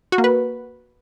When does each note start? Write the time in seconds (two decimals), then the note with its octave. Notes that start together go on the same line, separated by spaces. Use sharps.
0.12 F#4
0.18 A#3
0.24 B4